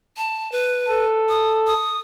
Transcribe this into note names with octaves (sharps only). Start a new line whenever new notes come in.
A5
B4
A4
D#6
D#6